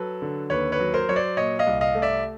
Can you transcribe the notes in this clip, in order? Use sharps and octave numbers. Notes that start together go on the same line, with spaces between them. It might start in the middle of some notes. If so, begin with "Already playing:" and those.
Already playing: F#3 A4 B4
D3
D#2 B4 C#5
B4 C#5
F#3
A#4 C5
F#3 C#5
C5 D5
A#2 C#5 D#5
D#5 F5
C2
D#5 F5
A3
D5 E5